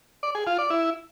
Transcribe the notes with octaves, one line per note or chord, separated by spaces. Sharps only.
D5
G#4
F4
D5
E4